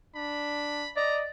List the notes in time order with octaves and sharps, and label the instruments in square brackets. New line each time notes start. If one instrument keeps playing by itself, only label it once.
[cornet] D4 [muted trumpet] B5
[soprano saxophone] D5 [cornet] D#5 [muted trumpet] A#5